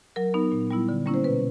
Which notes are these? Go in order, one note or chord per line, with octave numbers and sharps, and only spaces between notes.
F#3 A#4
B3 D#4
A#2
G3 B3 E4
D3
G3 A#3 C#4 E4
C5
B2 B4